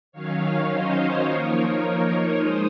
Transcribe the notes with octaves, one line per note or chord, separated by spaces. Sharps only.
D#3 F#3 C#4 C#5 F5
C5 D#5
F3 A#3 D#4 A#4 C#5
A#4 C#5
G#3 D#4 C5 D#5